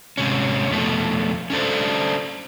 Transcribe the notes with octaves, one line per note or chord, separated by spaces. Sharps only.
G#2 C3 C#4
F2 B2 A3
C#4 D4 A4 C5